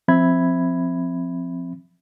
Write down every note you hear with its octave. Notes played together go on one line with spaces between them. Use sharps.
F3 C4 E5 B5 G#6